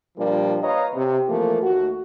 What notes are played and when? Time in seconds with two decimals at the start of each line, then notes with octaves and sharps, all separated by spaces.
0.18 A#2 F3 G3 A#3 D4
0.63 B4 C#5 D#5 F5 A#5
0.95 C3
1.28 E3 F3 A3 A#3
1.63 D#2 A3 F#4